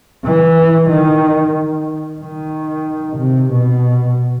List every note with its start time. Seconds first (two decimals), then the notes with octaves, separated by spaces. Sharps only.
0.25 E3
0.89 D#3
2.20 D#3
3.17 C3
3.51 B2